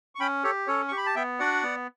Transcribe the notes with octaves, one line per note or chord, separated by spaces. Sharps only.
C#6
C#4 G5 B5
G4 A4 C#5
C#4 A4 C#5
G4 C#6
B5
A5
B3 E5 G5
D4 F#4 D5 F#5
B3